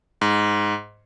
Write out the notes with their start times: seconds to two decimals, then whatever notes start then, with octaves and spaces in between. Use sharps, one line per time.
0.21 G#2